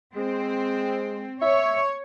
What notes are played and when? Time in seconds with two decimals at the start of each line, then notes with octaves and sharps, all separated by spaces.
0.16 G#3 C4
1.42 C#5 E5